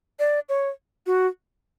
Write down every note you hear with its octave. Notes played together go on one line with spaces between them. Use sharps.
D5
C#5
F#4